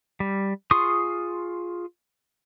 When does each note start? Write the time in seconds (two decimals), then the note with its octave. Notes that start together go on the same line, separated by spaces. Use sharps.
0.20 G3
0.71 F4 G#4 C6 C#6 D#6